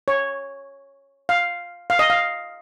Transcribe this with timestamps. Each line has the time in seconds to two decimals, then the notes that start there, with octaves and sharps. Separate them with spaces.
0.08 C#5
1.29 F5
1.90 F5
1.99 D#5
2.10 F5